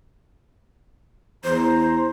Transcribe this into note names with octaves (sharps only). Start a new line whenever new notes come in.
E2 C5 A#5